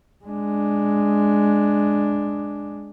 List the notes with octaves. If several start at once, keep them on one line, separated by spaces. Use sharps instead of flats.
G#3 D4